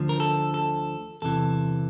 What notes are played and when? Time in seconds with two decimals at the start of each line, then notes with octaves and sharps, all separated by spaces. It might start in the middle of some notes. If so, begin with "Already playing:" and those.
Already playing: D2 D3 F3
0.09 A#4
0.20 A4
0.54 A4
1.22 E2 C3 E3 A4